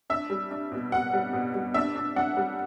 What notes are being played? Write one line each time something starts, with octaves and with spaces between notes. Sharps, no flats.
D4 E5
G3
D4
B2
B2 F#5
G3
B2
G3
D4 E5
D4
D4 F#5
G3